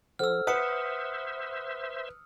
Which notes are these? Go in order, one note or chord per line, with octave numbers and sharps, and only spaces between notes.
F3 A4 C5 F#5 E6 F6
B4 C5 E5 F#5 D#6 C#7